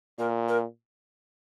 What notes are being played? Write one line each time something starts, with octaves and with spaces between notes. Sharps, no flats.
A#2 A#4
A#4